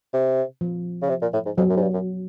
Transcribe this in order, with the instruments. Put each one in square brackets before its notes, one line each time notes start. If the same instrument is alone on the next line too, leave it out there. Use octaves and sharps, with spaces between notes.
[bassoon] C3
[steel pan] F3
[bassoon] C#3
C3
A#2
A2
G#2
[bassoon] F2 [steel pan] F#3
[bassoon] F#2
G#2
G2
F#2